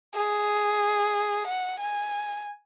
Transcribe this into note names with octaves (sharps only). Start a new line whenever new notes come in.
G#4
F#5
G#5